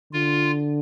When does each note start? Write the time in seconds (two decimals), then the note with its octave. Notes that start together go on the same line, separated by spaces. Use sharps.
0.13 D3 F4